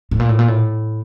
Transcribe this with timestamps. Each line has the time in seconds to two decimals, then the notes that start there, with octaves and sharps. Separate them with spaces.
0.11 A2
0.20 A#2
0.29 A2
0.39 A#2
0.48 A2